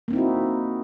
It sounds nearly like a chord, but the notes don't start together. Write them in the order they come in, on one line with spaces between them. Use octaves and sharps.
A#3 C4 D#4 E4 F#4